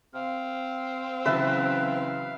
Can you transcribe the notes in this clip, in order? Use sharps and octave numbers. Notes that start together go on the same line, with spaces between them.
C4 F5
C#3 E3 F#3 B4 E5 A5